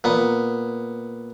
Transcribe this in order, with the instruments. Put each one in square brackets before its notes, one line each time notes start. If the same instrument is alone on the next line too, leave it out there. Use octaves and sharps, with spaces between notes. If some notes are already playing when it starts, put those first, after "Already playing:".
[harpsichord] A#2 B3